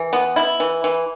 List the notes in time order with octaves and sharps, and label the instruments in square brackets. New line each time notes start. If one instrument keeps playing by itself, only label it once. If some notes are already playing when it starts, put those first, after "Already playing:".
Already playing: [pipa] E3
B3
E4
E3
E3